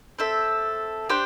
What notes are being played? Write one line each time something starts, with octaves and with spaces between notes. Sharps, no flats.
C4 A4 E5
D4 G4 C5